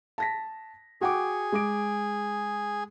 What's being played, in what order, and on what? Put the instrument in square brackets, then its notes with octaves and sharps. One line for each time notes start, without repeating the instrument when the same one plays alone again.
[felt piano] A5 A#6 B6
[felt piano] F#4 G5 D6 [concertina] G#4
[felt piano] G#3 D6 D7